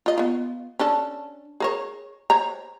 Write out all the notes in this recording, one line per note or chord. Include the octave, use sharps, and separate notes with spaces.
F4 D#5
B3 F4
C#4 D4 A4
G#4 A#4 C#5
C5 C#5 A#5